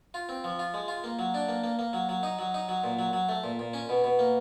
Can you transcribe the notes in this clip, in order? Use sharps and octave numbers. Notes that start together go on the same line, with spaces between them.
F4
C4
F3
F4
G#3
F4
A#3
F#3
D4
A#3
A#3
A#3
F#3
F#3
D#4
F#3
D#4
F#3
A#2
F#3
F#3
A3
A#2
A#2
C#4
B2
B2
A#3